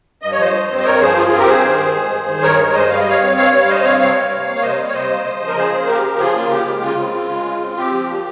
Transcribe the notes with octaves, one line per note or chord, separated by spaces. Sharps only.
G2 D#5
C#5
F3 C5 D#5
G2
C4
D#5
G2 A#4 C#5
F3 G#4 C5
G2 F4 G#4
F4 G#4
C4
G4 A#4
G2 G#4 C5
D#3
G2
G#3
G2
D#3
G2 A#4 C#5
G#3
G2 C5 D#5
G3 F5
D#5
G2 C#5 F5
C4
G2 C#5 F5
G3
G2 C5 D#5
C4 C#5 F5
C3 C#5 F5
G3
C3
A#3
C#5
C3 C5 D#5
G3
C#5
C3 C5 D#5
A#3
C#3
F3
A#4
C#3 G#4 C5
A#3
C#3 G4 A#4
F3
C#3 F4 G#4
A#3 F4
C#3 G4
G#3
C#3 F4
C4
C#3
G#3
C#3
C4
C4 G4
F3
A#2